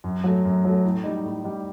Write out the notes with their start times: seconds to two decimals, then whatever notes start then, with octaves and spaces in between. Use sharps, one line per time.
0.04 F#2
0.24 F#3 A3
0.45 F#2
0.65 F#3 A3
0.85 A2
1.04 G3 D#4
1.24 A2
1.44 G3 D#4